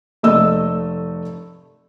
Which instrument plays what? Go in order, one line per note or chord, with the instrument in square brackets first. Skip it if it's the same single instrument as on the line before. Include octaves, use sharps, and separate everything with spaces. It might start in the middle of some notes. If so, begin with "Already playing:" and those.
[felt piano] F1 A3 D#5 E6